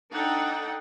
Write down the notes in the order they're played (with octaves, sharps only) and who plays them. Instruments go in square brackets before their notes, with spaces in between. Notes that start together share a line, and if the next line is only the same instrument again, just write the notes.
[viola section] D4 D#4 A4 F#5 G5